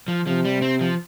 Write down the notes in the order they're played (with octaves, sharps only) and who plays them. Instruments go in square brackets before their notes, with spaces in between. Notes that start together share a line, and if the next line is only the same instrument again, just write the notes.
[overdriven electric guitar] F3
[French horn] C3 [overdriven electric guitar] F3
[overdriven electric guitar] G3
C4
F3